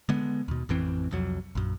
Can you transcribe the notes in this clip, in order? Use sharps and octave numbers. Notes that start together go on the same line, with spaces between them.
D3 G#3 B3
D#2 B2
A1 F2 E3 C4
C2 F2 F#3
A#1 F#2